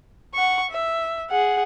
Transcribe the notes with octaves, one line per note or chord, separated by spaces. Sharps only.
F#5 C#6
E5
G#4 F#5